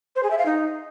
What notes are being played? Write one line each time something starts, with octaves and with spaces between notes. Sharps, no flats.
C5
G#4
E5
F5
D#4